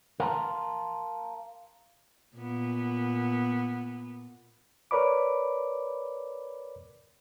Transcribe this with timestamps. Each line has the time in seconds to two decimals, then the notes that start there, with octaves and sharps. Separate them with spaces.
0.20 A#4 F5 A5 A#5 C6
2.36 A#2 B3
4.91 A#4 B4 C#5 D5 B5 D6